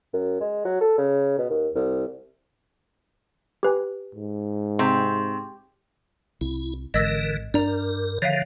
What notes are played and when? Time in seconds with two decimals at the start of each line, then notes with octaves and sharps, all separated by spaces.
0.13 F#2
0.41 G#3
0.65 F#3
0.81 A4
0.98 C#3
1.38 B2
1.50 D#2
1.75 C2
3.63 G4 B4 G#5
4.15 G#2
4.79 C3 C6 C#6 G6
6.41 C2 E4
6.94 G#1 D3 E3 A#4 D#5 E6 A#6
7.54 G2 D4 A#4 D5 A#5
8.22 D3 D#3 F3 C#5 E5 F5